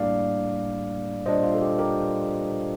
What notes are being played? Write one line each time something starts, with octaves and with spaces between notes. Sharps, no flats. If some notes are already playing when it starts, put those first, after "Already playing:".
Already playing: A2 G3 A#3 D4 D5 F5
A#2 G3 D4 C5 D#5
F4
A4
G4
G4 A#4